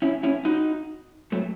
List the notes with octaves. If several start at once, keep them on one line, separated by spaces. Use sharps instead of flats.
C#4 E4
C#4 E4
D#4 F#4
F#3 A3